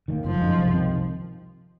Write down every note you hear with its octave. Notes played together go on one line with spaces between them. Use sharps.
D#3 G3 A#3
F#1 F3
F#2 D#3 G#3
C2
C3 D#3